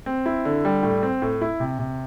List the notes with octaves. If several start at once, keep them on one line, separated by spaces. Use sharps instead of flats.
C4
E4
D3
G3
A2
C4
A2
E4
C3
C3